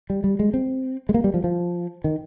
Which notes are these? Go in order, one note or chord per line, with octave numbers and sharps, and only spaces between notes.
G3
G3
G#3
C4
G#3
A#3
G3
F3
F3
D#3